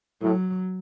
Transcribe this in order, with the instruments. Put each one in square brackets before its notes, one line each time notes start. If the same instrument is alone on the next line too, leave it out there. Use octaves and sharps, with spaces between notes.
[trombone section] A2 [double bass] F#3